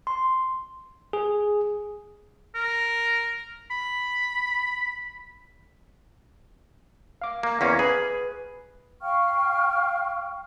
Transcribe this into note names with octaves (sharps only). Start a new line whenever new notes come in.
C6
G#4
A#4
B5
F5 D6
A#3
E2 A#3 C#4 B6
G#4 B4
F5 G5 C#6 F6